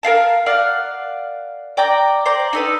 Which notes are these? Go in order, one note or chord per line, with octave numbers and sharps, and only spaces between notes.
A#4 D5 F5 A5
A#4 D5 F5 F#5
D5 G5 A#5 D6
C5 D5 A#5
D#4 A4 B4